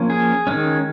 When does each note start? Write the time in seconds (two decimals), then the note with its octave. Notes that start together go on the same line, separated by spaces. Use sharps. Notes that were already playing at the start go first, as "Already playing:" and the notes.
Already playing: F3 A#3 C#4
0.10 G#4
0.47 D#3 G#3 C#4